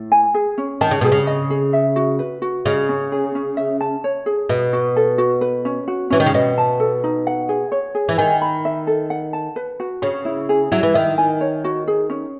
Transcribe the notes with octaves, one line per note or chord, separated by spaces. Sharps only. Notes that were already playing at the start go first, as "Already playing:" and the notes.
Already playing: A2
G#5
G#4
C#4
D#3 A5
C#3
B2 G#4
C#3
D#5
G#4
E5
F#4
B4
F#4
C#3 D#5
C#4
G#4
C#4
E5
A5
C#5
G#4
B2 D#5
F#4
A4
F#4
B4
C#4
F#4
E3 C#4
D#3
C#3
B2 D#5
A5
A4
D#4
F#5
G#4
C#5
G#4
E3
D#3 G#5
B5
E5
A4
F#5
A5
B4
F#4
C#3 C#5
E4
G#4
F#3 E4
E3
D#3 E5
G#5
C#5
F#4
G#4
C#4